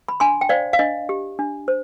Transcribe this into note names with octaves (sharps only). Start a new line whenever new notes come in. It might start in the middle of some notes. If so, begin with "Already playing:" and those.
B5
D4 G#5 C6
G5
C5 D5 F5
F5
D4 D#5
G4
D4
C5